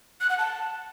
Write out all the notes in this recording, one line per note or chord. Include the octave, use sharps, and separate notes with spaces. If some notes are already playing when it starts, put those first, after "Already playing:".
F#6
F#5
A5